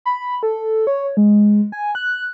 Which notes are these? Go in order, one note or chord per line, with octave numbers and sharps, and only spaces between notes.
B5
A4
C#5
G#3
G#5
F#6